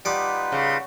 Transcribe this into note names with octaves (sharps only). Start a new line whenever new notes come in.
G3 D#4 F4 B4 F#5 D6 D#6
C#3